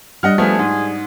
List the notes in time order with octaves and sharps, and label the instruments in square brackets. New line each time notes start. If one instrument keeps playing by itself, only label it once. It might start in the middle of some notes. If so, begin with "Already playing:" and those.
[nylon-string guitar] G3 D4 [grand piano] D#5 F#5 F6
[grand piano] F3 A3 B3 [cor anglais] G#4
[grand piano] G#2